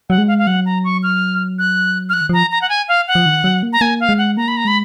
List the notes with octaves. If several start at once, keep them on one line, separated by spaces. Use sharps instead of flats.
F#3 F#5
G#3
F5
F5
F#3 F#5
A#5
C#6
F6
F#6
F6
F3 F#6
D#3
F3 A#5
A#5
F#5
G#5
F5
F#5
F3
D#3
F#3
A#3
A#5
A#3 G#5
F5
G#3
F#5
A#3 A#5
B5
A#5
G#3 B5